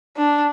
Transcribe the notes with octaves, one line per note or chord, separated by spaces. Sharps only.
D4